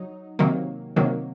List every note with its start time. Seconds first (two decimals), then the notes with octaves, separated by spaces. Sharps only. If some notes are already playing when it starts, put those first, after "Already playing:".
Already playing: F#3 D#4
0.39 C3 D#3 F#3 A#3
0.96 C3 D#3 F#3 A#3